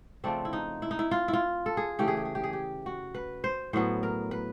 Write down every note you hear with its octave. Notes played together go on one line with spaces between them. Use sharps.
C#3 F3 A3 C4 D4
E4
D#4
E4
D#4
E4
F4
E4
F4
A4
G#4
C#3 E3 A3 G4
G#4
G4
G#4
G4
G#4
G4
F#4
B4
C5
A2 F#3 B3 C5
A#4
B4